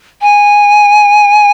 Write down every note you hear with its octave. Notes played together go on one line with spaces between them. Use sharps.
G#5